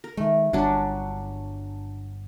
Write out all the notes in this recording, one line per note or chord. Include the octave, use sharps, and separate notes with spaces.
A#4
D#3 G#3 A3
G1 G2 F#3 C#4 D4